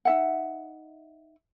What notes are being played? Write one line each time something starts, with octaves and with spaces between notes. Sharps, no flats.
D#4 E5 F#5